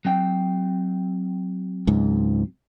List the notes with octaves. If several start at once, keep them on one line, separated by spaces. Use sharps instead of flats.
F#3 C4 G5
C#2 G#2